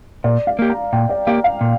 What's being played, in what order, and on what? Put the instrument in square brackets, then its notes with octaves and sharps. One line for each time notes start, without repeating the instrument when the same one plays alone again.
[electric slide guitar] A#2 [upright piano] D5
[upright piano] F5
[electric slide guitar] A#3 G4
[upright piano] A#5
[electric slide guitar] A#2 [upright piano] G5
[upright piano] D5
[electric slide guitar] A#3 G4 [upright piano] F5
[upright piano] F5
[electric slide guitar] A#2